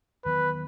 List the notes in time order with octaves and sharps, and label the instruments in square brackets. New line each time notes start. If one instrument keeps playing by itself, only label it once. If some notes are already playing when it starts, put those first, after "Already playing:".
[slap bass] E2 D#3 F#3 B3 [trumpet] B4